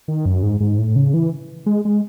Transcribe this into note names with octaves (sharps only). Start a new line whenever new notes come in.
D#3
F#2
G#2
G#2
A2
C#3
E3
G#3
G#3